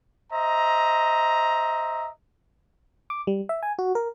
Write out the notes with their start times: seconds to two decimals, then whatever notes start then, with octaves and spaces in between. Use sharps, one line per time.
0.32 C5 D#5 E5 A#5
3.10 D6
3.27 G3
3.49 E5
3.63 G#5
3.79 F#4
3.95 A#4